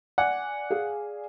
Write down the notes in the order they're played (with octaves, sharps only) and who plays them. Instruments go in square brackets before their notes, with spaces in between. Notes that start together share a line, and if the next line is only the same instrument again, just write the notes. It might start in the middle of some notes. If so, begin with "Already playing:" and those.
[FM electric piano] D5 G#5 [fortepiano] F#5
[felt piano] G#4 F5